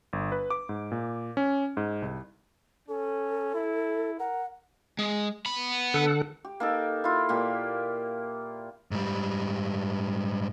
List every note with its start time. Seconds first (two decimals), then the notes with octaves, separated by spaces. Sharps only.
0.13 G1
0.32 B4
0.50 D6
0.69 G#2
0.92 A#2
1.37 C#4
1.77 G#2
2.02 C2
2.88 C#4 A4
3.54 E4
4.19 A#4 F#5
4.99 G#3
5.46 B3 B5
5.94 D3 A4 F#5
6.45 G4
6.60 A#3 D#4 A4
7.04 E4 F4
7.29 A#2 A#3 G4
8.91 G#2 G3